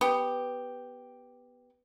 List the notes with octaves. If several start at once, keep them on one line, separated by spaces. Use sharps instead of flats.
B3 G4